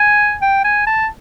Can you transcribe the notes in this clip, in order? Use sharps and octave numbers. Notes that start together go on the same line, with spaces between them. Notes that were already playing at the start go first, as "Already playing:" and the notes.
Already playing: G#5
G5
G#5
A5